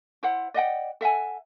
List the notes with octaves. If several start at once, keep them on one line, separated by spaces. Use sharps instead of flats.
E4 C5 F#5
D5 D#5 F#5 G5
A4 E5 F#5 G#5